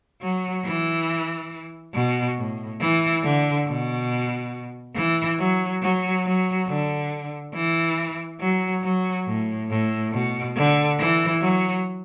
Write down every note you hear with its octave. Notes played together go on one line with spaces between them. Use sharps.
F#3
E3
B2
A2
E3
D3
B2
E3
F#3
F#3
F#3
D3
E3
F#3
F#3
A2
A2
B2
D3
E3
F#3